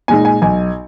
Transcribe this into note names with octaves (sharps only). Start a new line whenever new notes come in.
A#2 G#3 D#4 G#5
G#5
B1 G#5